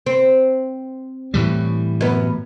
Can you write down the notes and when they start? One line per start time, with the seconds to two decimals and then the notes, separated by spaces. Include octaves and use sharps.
0.06 C4
1.34 A2 E3 G3
2.01 F#2 B3